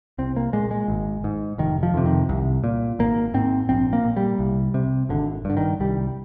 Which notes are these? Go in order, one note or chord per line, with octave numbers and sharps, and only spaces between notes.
C2 C4
A#3
A#2 G#3
G#3
G#1
G#2
F1 D#3
F3
F2 C3
D#3
C2
A#2
G#1 A#3
G#2 C4
A#1 C4
A#3
A#2
G3
C2
C3
G#1 D3
G2 D3
D#3
C2 G3